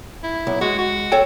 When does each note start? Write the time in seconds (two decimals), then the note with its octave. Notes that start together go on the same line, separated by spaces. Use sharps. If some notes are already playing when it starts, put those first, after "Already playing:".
0.23 E4
0.47 B1
0.61 G#3 F#4
0.79 F#4
1.12 A4 C#5 G5